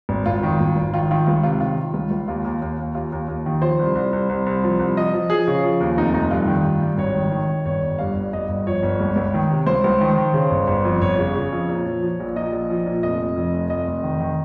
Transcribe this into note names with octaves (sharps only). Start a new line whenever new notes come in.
G#1
G#1 F4
D#3
G#1
G#1
D#3 F4
D#3 F4
C#2 F4
C3 F4
D#3 F4
D#3
C#2
C#2
D#2 F4
D#2
D#2
D#2
D#2 F4
D#2
D#2
D#3
F3 C5
C2
C2
C2
C2
C2
F3
C2
F3 D#5
F3
F3 G#4
C#3
F3
D#2
F1 D#4
F1 D#4
G2 F4
D#3
G2
G2
G#1 C#5
D#3
D#3
D#3
G1 C#5
G1
G2 F5
G1
G2 D#5
G1
F3 C#5
G1
C#2
C#2
D#3
C3
C#2 C5
C#2
D#3
D#3
C#3
G1
G1
F2
G1 C#5
C#3
C#3
F2
A#2
F3
F3
A#1
A#2 D#5
A#1
F3
A#2
F1 D#5
F1
F2
F1
F1 D#5
F1
D#3
D#3